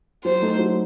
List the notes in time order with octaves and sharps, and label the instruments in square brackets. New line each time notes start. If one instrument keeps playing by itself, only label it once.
[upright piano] F#3 [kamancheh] C5
[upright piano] A3 D#4 F#4 A4
F#3